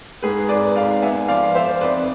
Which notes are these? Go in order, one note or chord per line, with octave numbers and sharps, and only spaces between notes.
G#2 G#4 B4
G#1 B4 D5
G#1 D5 F5
B3 E5 G#5
F3 D5 F5
F3 C5 E5
F2 B4 D5